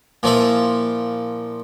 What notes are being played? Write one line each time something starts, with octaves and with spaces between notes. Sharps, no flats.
A#2 F3 E4